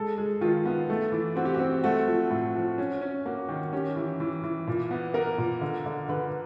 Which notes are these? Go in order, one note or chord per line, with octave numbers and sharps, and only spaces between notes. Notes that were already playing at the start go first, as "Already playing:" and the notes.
Already playing: G#3 A4
G#3
D#3 F4
B3
A3
E3
C4 F#4
G4
F#4
C4
A3 F#4
F3
A2
F3
C#4
C#4
A#3 F#4
D#3
C#4 G4
E3
E3
E3
A#2
B3
B3 A#4
A#2
D3
D3
D3 B4